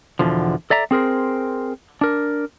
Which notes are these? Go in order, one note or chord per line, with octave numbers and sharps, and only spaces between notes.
E2 B2 D3 F3
A4 D5 E5 A#5
C4 G#4 A#4 C5
D4 A#4